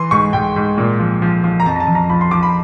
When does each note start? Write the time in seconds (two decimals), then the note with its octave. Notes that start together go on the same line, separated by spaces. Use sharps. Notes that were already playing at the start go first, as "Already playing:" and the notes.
Already playing: E3 C6
0.11 G#2 C#6
0.33 G#2 G5
0.56 G#2
0.78 A#2
1.00 F3
1.22 F3
1.44 F3
1.60 A#5
1.66 F2 A5
1.76 A#5
1.80 A5
1.88 F2
1.95 A#5
2.10 F3 B5
2.21 C6
2.31 F3 D6
2.43 B5